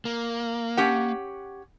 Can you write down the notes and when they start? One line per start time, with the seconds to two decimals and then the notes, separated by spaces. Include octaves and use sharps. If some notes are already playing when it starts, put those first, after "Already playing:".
0.05 A#3
0.77 C#4 G4 F#5